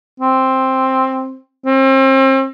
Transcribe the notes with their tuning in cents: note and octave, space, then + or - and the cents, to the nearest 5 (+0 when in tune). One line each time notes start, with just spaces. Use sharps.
C4 +10
C4 +35